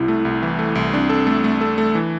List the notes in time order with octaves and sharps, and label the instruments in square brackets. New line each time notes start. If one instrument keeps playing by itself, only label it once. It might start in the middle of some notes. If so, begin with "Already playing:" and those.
Already playing: [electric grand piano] C2 C3 [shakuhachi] E4
[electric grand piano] A3
C2
E3
A3
C2
[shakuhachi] C4 [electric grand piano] D4
[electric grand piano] A4
A3
A3
A4
A3
E3